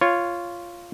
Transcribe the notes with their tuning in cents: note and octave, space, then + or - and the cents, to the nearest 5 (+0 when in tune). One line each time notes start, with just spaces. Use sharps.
F4 -5 C#5 +0